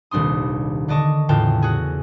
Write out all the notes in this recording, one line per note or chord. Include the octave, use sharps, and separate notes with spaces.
D#1 C2 D4 C6 D#6
D3 D5 D#5 A5 C#6
E2 A2 C#3 F4 G5 A5
F#4 G#4